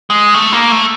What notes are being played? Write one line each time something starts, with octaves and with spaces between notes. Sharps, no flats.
G#3
A3
A#3
A3